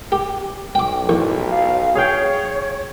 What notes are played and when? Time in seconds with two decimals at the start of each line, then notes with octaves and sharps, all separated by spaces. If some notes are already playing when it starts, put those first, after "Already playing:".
0.12 G4
0.75 B1 G5 D6
1.09 A1
1.50 F5
1.95 G#4 C#5 F5 G5